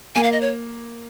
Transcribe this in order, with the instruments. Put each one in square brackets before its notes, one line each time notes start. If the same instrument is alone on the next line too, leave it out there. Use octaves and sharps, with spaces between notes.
[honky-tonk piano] A#3 [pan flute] G#5
[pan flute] F5
D#5
C#5